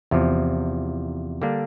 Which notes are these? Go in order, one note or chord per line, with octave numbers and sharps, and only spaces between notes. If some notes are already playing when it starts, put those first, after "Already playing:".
E2 C3 F3
D3 G3 A#3 D4